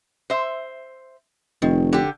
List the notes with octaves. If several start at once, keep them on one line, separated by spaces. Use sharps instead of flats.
C5 E5
F1 D#3
D3 G4